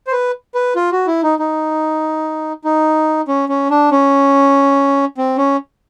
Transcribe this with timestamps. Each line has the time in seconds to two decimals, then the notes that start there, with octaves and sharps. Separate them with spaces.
0.07 C5
0.12 B4
0.55 B4
0.76 F4
0.92 F#4
1.07 E4
1.23 D#4
1.39 D#4
2.64 D#4
3.28 C#4
3.49 C#4
3.70 D4
3.91 C#4
5.18 C4
5.38 C#4